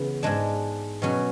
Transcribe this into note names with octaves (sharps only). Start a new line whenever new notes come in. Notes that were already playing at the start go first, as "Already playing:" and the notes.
Already playing: C#3 E3 B3
G#2 G#3 D4
B2 F#3 C#4